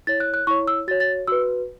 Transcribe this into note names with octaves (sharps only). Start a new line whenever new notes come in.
E4 C#5 A6
F#6
F#6
E4 C#5 C#6
E6
F#4 C#5 A6
A6
F#4 B4 E6